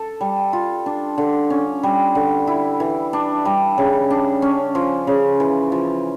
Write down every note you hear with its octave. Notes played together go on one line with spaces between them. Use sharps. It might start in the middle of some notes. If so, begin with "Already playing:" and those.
Already playing: A4
G3
F4
D4
D3
C#4
G3
D3
E4
E3
D4
G3
C#3
D4
C#4
F3
C#3
E3
F3